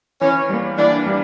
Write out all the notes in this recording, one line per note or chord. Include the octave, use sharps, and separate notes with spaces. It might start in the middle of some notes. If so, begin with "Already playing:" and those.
E3 C#4
G3 A#3
E3 D4
G3 A#3